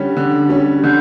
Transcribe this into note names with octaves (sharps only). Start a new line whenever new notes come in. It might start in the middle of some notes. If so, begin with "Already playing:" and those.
Already playing: D3 G3 C#4
D3
G3 C#4
D3 G6